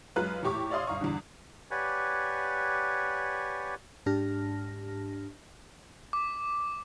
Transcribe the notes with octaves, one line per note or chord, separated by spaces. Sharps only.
F#2 G#3 F4 B4 F#6
E2 A2 G4 C#6 D6
C#5 D5 E5 F5 C6 D#6
G1 F5 A#5 C#6
E2 G2 D3
G4 B4 C#5 D5 F#5 G#5
G#2 D4 G4 A5 F6 A#6
D6